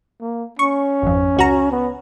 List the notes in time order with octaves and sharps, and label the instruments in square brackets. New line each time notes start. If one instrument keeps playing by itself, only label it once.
[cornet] A#3
[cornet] C#4 [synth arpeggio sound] C#6
[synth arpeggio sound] G#1 F2
C#2 F#4 A#5
[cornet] B3